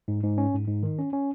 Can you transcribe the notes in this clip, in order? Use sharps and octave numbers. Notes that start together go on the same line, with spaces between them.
G#2
G#2
C#4
G#2
G#2
D#3
C#4
C#4